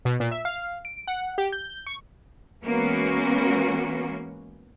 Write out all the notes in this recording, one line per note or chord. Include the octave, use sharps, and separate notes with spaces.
B2
A#2
E5
F5
D7
F#5
G4
G6
C#6
E3 G#3 A#3 B3 C#4 F#4